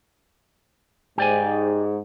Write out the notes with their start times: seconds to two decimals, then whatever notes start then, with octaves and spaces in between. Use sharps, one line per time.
1.18 G#2 G4 D5 G#5